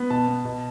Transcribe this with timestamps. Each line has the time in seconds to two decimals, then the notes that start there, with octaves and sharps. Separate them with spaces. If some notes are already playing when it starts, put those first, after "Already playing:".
Already playing: B3
0.10 B2 A5
0.28 B3
0.45 B2